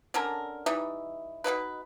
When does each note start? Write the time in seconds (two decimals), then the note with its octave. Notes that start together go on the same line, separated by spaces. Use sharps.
0.14 D3 C#4 A4 A#4
0.66 E3 G3 D#4
1.44 B2 G#3 D#4 B4